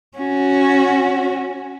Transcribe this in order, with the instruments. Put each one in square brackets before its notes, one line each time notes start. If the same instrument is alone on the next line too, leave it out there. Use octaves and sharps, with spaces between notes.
[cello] C#4 F#4